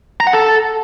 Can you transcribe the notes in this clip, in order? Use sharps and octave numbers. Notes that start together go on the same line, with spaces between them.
A#5
F#5
A4